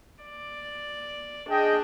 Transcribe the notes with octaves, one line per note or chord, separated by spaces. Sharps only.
D5
D4 G#4 D#5 G5